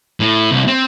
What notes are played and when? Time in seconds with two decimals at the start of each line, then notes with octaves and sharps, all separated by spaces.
0.20 A2
0.52 C2
0.68 C4